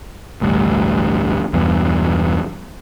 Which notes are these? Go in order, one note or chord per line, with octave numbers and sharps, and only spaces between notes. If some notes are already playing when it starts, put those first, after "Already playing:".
A1 D2 G2
E2 G2 B2